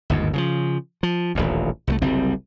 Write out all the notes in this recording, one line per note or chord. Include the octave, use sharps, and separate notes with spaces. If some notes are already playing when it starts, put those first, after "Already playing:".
G1 D#2 G#2
C#3 E3 F3
F3
D#1 A1 D2
C2 G3 A3
F#1 C2 G3 C4